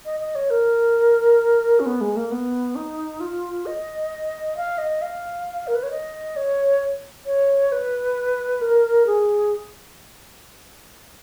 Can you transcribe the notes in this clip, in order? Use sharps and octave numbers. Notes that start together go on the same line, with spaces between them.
D#5
D#5
C#5
A#4
C#4
B3
G#3
A#3
B3
D#4
F4
D#5
F5
D#5
F5
A#4
B4
C#5
D#5
C#5
C#5
B4
A#4
G#4